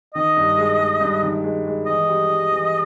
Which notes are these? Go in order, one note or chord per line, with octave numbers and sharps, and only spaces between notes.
D#3 D#5
G2
G#3
G#3
G2
D#3
G#3
G#3
E3 D#5
G3
G3
E3